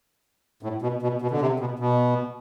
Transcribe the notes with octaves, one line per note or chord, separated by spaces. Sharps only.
A2
B2
B2
B2
D3
C3
B2
B2